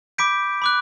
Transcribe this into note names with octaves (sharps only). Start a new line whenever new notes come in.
B5 D6 G6 B6 D7
B5 D6 F#6